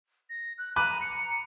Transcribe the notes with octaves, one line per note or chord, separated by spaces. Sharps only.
A#6
F#6
A#5 B5 D6 F#6 D#7
C#7